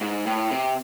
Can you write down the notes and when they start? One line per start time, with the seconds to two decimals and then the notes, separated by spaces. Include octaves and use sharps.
0.01 G#2
0.27 A2
0.51 C3